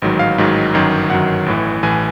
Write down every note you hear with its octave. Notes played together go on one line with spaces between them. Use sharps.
A1 G#2 D#3 F#3
F5
A1 G#2 D#3 F#3
G1 F#2 D#3 F#3
G1 F#2 D#3 F#3 F#5
A1 A2 E3
A1 A2 E3 G#5